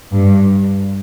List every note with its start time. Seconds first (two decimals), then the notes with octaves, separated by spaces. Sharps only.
0.11 G2